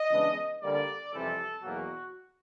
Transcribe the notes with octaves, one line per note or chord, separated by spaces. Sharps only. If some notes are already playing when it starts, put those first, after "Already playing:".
Already playing: D#5
C#3 E3 G#3 B3 D4
D3 G3 A#3 D5
F2 C3 E3 G3 A4
E2 B2 F#3 A#3 C#4 F#4